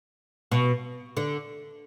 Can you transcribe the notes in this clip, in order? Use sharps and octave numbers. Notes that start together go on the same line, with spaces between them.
B2
D3